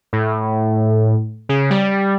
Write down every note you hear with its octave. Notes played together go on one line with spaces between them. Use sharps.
A2
C#3
G3